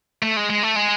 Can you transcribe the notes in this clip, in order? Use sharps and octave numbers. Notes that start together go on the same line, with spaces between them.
A3
G#3
G#3
A3
G#3